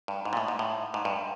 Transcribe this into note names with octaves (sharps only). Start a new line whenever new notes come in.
G2
G#2
A#2
A2
G#2
A2
G#2
G2